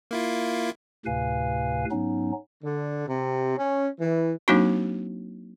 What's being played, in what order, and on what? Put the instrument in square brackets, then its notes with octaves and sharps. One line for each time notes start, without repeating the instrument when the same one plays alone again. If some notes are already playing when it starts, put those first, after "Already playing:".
[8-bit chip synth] A#3 E4 F4
[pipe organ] D2 A2 C3 B4 F5 G#5
G#2 F#3 B3 C#4 D#4
[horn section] D3
C3
C#4
E3
[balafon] F#3 A#3 C4 D4 D#4 F#4